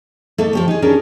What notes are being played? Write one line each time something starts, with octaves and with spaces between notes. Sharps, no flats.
A3 A#3 D#4 A4
F3 G4 C#5
D#4 G#4
C#4 D4 G4 G#4 A#4